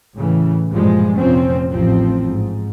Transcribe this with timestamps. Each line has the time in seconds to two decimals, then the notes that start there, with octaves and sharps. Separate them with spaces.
0.16 A2 C#3 E3
0.71 G2 A#2 F3 G3 G#3
1.18 F1 A#2 F3 C4 C#4
1.71 A1 F3 C4
2.27 G#2